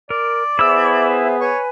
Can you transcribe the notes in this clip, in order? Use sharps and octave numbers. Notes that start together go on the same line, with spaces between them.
A#4 D5
B3 E4 G#4 C5 E5 E6
B4 C#5 G#5